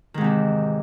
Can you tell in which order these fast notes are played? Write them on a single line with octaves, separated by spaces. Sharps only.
D#3 G#2 C3 E3